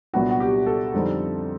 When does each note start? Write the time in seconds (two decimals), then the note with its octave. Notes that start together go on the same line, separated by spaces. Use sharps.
0.13 C2 A#2 F#3 B3 D4 F#4
0.31 F#4
0.40 G4
0.66 A4
0.94 F2 D3 G3 C4 D#4